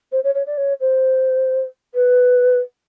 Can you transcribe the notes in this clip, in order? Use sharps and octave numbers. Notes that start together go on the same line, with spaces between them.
C5
C#5
C#5
D5
C#5
C5
B4